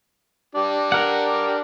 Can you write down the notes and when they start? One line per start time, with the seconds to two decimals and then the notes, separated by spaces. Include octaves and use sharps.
0.55 D4 G4
0.92 A#4 F#5